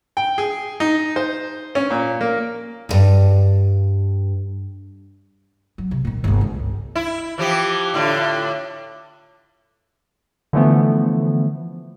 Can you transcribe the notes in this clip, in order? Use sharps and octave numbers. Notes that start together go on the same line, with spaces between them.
G5
G#4
D#4
C5
C#4
A#2
A#3
D2 G2
F#3
C3
A#2 D#3
G1 C#2
C#2
E4
E3 F3 G4
A2 D3 F4
D3 E3 F3 A3 B3